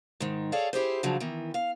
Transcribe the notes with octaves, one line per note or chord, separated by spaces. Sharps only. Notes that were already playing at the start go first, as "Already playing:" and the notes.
G#2 D#3
G#4 A4 C#5 D5 F5
E4 G4 G#4 C5
C#3 F3 F#3 D4
D#3 E3 B3
F5